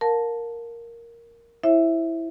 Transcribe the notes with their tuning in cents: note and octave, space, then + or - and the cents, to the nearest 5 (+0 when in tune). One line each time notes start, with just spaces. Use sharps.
A#4 +0 F5 +35 A5 +0
E4 +0 C5 +40 E5 +0